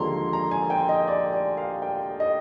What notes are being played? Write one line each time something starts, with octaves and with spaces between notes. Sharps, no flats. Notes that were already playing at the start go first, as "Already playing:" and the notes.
Already playing: D#2 D3 F3 G#3 A#5 C6
A#5
G#5
G5
D#5
D5
D5
F5
G5
D#5